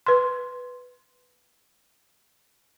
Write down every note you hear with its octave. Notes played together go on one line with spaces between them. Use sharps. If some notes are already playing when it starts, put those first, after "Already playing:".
B4 C6